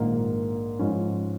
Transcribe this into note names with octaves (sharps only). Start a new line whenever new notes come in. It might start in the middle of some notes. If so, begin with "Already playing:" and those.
Already playing: A#1 G#2 D#3 A#3 F4
G#2 F3 C#4